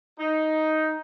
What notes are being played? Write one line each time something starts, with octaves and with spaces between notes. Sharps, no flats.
D#4